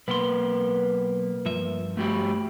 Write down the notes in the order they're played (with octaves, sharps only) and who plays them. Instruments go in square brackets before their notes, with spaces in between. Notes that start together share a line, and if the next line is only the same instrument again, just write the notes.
[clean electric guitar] B1 C6 [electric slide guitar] A#3 B4
[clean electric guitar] G2 F3 E5
[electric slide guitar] A3 F#4 G4